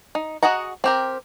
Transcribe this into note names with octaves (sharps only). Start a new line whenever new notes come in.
D#4
F#4 G#4 D#5 F#5 A#5
C4 G4 A#4